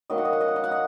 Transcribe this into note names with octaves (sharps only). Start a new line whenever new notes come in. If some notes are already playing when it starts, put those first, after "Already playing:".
D#3 F#3 A#3 D#5
F#5
D#5
F#5
D#5
F#5
D#5
F#5
D#5